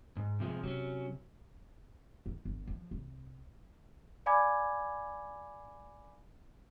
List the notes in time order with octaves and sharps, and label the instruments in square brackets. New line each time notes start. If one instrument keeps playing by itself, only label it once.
[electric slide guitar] G#2
C3 F3 G#3
[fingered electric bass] C3 [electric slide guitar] F#3 C#4
[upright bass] D#3
G1
F3
C2
[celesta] D5 F5 G#5 B5 D6 G#6